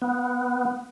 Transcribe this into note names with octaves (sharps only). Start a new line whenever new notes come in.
B3